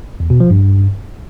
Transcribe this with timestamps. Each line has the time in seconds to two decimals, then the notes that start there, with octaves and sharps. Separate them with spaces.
0.20 E2
0.30 B2
0.40 F3
0.50 G2